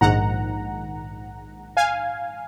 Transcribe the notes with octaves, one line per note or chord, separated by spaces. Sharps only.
A#1 G#2 D#3 F#5 A#5
F5 G#5